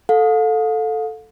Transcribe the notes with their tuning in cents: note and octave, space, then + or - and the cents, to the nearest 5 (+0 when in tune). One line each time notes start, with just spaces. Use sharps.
A4 +0 F5 +40